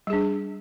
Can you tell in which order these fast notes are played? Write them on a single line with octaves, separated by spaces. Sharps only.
G3 G#4 D4